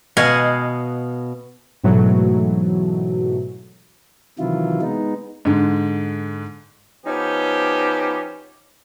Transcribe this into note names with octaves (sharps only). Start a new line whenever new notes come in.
B2 D#5 F5 F#5 G#5
G#2 B2 E3 F#3 A3
C3 D#3 E3 F#3 E4 F4
G#3 B3 D#4
G#2 D3
F3 B3 C#4 D#4 G4